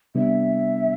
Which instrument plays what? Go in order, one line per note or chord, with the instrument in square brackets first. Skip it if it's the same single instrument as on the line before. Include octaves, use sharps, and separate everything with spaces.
[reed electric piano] C3 G3 B3 D4 [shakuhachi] E5